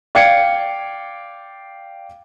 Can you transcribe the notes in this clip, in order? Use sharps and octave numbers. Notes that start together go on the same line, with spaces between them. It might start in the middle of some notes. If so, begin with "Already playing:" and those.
D5 F5 G5 G#6 C#7